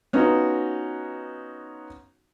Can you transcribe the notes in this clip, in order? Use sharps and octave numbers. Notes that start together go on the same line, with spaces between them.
B3 C#4 D#4 F4 F#4